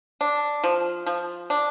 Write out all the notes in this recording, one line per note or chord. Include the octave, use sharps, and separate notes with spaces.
D4
F3
F3
D4